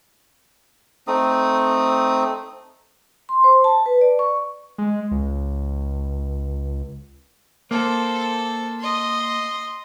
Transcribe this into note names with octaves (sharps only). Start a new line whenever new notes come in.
A3 C4 D#4 D#6
C6
C5
A5
B4
D5
C#6
G#3
C#2
A#3 A4 C5
D#5 C6